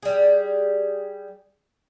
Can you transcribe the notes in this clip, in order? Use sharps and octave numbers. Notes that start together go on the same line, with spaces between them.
G3 G#4